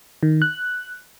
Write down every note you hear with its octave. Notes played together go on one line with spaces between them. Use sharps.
D#3
F#6